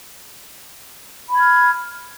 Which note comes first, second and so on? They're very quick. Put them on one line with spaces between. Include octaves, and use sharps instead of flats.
B5 G#6 F6